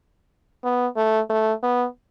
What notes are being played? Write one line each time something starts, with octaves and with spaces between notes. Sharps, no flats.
B3
A3
A3
B3